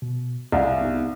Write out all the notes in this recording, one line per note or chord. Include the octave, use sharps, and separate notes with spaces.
B2
C2 F5 G#5
B3 D#4 G4